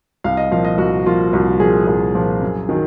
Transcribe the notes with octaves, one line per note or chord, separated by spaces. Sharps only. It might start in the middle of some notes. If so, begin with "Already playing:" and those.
C2 F5
D#5
A#2 F3 F5
D#5
C2 F#4
A#2 F3 F4
C2 F#4
A#2 F3 G#4
C2 G#4
A#2 F3
F#2
D#3 F#3